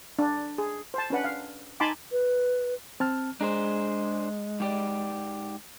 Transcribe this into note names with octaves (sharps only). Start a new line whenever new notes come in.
D4
G#4
C5 A5
C#4 D4 B4 F#5
F5
D#4 G#5 A5 B5 C6 D6
B4
C4 A5 F6
G#3 D4 G#4 C5 A#5
G#2 G4 D5